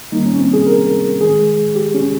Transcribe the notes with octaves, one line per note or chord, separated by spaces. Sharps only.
D#3 G3 A#3 D#4
C#4
C4
G#4
A#4
D#3 G#3 G#4
G4
C#4